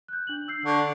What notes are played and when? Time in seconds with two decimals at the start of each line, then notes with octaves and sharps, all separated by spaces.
0.08 F#6 G6
0.27 D4 F#7
0.48 E6 G6 C7
0.65 D3 C#6